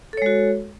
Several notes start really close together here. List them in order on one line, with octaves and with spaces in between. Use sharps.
A4 C#5 G#3 F#4